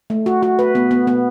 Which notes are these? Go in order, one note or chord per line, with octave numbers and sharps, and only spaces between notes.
A3
F#4
F#4
B4
B3
B3
B3